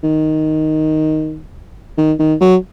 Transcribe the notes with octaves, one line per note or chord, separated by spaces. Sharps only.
D#3
D#3
D#3
F#3